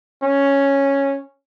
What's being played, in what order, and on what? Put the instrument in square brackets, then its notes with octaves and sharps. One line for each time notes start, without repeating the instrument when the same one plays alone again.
[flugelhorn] C#4